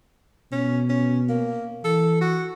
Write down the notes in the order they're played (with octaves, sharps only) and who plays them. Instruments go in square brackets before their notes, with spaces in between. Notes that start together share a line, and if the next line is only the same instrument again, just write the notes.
[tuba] B2 [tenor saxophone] C#4
[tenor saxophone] C#4
A#3
[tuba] E3 [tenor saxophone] A4
[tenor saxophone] F#4